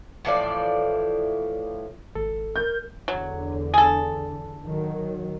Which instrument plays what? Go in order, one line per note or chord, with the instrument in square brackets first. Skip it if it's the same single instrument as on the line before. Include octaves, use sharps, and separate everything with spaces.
[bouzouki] A2 E3 F3 D5
[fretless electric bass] G#1 [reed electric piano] A4
[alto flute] A#4 [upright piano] G6
[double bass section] E2 D3 [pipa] F#3
[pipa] G#4 A4
[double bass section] D#3 F#3